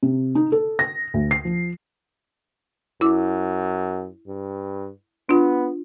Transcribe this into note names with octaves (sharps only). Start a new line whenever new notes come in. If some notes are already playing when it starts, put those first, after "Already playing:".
C3
D#4
A4
A#6
D2
C7
F3
F#2 E4 D6 E6
G2
B3 D4 F4